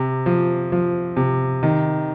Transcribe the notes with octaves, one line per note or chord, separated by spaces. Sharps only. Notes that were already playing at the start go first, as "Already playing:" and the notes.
Already playing: C3
F3
F3
C3
D#3